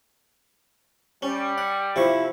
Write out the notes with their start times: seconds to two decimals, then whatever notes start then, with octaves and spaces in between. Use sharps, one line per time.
1.22 G3 C#4
1.58 F#5
1.96 C3 F3 E4 C#6